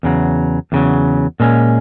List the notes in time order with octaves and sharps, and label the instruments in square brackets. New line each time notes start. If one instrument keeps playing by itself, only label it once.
[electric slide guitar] E2 C#3 F#3
E2 C#3 F#3
A#2 G#3 C#4